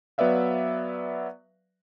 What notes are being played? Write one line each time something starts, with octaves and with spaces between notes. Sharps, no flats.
F#3 B3 B4 D5 E5 F5